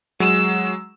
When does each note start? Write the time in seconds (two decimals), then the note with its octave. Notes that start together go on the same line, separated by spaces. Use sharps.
0.20 F#3 G#3 E6